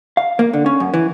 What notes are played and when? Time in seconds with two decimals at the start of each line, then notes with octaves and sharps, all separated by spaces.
0.17 F5
0.39 A#3
0.53 D3
0.66 C#4
0.80 F#2
0.94 E3